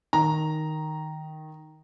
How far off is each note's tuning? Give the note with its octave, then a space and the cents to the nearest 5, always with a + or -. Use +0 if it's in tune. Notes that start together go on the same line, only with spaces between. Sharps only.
D#3 +0 A#5 +0